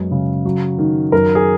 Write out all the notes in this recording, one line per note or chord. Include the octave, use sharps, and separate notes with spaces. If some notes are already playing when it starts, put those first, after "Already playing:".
Already playing: F#2 G#3 B3
C#3
F#3
D#3
F#2 A#4
G#4